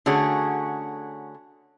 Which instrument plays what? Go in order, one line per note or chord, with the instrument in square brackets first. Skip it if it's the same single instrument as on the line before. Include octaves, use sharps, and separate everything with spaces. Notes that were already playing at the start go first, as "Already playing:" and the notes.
[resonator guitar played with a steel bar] D3 A3 C#4 F#4 G#4